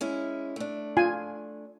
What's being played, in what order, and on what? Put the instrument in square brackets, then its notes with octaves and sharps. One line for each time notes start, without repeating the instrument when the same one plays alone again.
[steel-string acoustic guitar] G#3 C#4 E4
A3 D4
[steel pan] F4 G#5